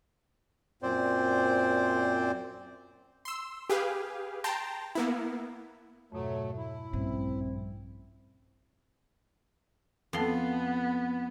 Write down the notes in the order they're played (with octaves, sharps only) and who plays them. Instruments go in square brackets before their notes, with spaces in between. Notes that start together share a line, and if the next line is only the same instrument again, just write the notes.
[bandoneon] F#2 A#2 C4 C5 D5
[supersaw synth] C6 E6
G4 G#4 B4 F5
G5 A5 A#5 C6
A#3 B3 E4
[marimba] F2 G#2 B2 [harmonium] F#3 A3
[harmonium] E4
[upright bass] A#1 G2 [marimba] A3 C#4 [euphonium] C4
[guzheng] F2 C6 [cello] B3